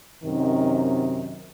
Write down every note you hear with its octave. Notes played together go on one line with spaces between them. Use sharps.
F#2 C3 D#3